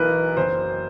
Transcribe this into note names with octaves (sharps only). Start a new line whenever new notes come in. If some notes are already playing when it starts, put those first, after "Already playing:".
Already playing: B1 E3 A#4 B4
F#1 C5